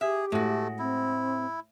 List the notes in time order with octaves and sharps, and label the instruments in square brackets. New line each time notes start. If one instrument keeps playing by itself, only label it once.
[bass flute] G4 [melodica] G#4 [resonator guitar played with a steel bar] E5
[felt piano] A2 [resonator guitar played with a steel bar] G#3 F#4 [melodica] A3
[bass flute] C4 [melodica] E4